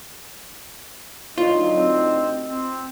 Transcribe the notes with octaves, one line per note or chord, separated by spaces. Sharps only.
D2 F#3 D#4 F4 D#5
C4
C4